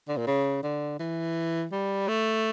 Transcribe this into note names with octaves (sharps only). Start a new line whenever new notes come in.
D3
A#2
C#3
D3
E3
G3
A3